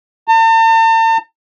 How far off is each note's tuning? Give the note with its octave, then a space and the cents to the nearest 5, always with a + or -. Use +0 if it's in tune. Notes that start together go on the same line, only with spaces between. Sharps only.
A5 +45